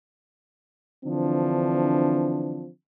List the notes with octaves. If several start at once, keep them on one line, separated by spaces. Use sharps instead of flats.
D3 E3 F3 C4 D4